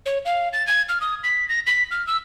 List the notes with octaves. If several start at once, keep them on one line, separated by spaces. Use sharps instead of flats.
C#5
F5
A6
G#6
F6
D#6
B6
A#6
B6
F6
E6